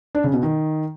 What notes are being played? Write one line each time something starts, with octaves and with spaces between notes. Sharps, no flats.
D4
C#3
B2
D#3